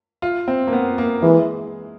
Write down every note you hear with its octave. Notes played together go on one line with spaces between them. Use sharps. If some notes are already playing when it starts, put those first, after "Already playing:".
F4
C4
A#3
B3
A#3
E3 G#3